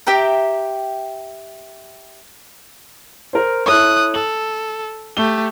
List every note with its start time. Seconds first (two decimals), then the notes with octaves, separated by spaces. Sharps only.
0.07 G4 E5 G5 A#5
3.33 A#4 C5
3.66 E4 A4 C#5 D#6 F#6
4.14 A4 F#7
5.17 A3 G4 G7